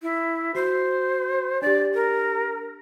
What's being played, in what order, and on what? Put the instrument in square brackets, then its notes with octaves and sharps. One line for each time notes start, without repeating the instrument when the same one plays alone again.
[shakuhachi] E4
[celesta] F#4 C7 [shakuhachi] C5
[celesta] D4 G4 [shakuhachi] D5
[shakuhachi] A#4